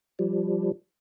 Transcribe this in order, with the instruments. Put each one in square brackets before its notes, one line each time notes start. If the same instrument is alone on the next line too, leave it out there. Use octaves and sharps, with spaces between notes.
[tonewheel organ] F3 G3